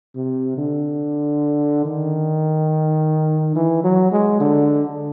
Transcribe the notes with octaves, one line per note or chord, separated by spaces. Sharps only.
C3
D3
D#3
E3
F#3
G#3
D3